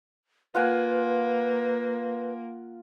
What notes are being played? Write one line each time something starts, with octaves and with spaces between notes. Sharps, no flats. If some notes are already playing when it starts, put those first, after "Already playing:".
A#3 F4 B4 F#5 G#5